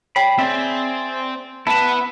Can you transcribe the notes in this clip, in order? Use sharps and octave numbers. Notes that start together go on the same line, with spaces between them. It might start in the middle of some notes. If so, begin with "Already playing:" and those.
C#5 G5 B5 C7
C4 G#4 D5 E5
B3 E4 B4 F#5 A5 E7